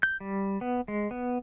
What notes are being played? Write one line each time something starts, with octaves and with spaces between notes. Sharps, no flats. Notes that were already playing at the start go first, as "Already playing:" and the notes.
G6
G3
B3
G#3
B3